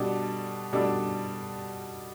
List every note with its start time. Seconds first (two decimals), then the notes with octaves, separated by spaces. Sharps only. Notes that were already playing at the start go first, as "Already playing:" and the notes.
Already playing: B2 G3 D4 A4
0.73 B2 G3 D4 A4